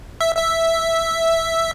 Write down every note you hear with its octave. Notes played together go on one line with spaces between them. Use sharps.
E5
E5